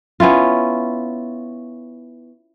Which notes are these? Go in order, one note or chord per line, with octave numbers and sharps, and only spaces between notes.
B3 C#4 E4 F4